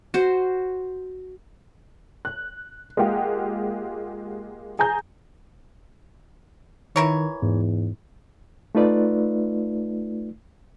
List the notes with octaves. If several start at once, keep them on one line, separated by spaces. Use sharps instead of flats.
F#4 C5
F#6
G#3 A#3 F4 G4 F#5
G#4 G#5 A#5 G6
D#3 E3 A#4 C#5
E2 G#2
A3 D#4 F4 B4 D5